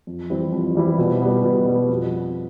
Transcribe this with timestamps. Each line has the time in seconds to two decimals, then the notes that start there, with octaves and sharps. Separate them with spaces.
0.07 F2
0.30 E3 G3 C4 E4
0.52 F2
0.75 E3 G3 C4 E4
0.98 B2
1.21 G3 B3
1.44 B2
1.66 G3 B3
1.89 F2